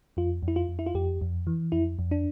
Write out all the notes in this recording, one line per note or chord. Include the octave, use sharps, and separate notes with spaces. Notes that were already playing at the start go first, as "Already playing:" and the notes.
F2 F4
F2
E4
F4
F2
E4
F4
F2 G4
F2
E3
F2 E4
F2
D4